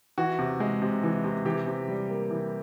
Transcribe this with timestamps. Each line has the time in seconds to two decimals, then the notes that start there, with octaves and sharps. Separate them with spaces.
0.18 E3 F#4
0.39 C3
0.60 G#3
0.82 C3
1.03 E3
1.24 C3
1.45 E3 G4
1.67 C3
1.88 G3
2.10 A#3
2.31 E3